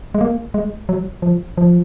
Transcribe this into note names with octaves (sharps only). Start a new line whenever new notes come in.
G#3
A#3
G#3
F#3
F3
F3